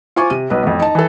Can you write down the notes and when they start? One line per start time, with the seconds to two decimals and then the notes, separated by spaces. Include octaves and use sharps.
0.16 F4 C5 G#5 C#6 D6
0.30 C3 D#7
0.50 B1 B4
0.63 A1 F2
0.80 D#4 A5
0.95 E3 A4